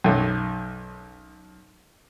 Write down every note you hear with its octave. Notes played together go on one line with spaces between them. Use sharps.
B1 F#2